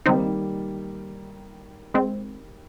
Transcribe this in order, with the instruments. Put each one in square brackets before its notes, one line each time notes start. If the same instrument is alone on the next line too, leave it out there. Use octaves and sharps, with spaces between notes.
[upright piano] D#3 G3 A#3 [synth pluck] C4 D#4
[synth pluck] G#3 C4